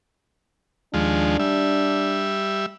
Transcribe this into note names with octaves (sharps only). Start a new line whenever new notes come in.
D#2 F3 G#3 D4
G3 E5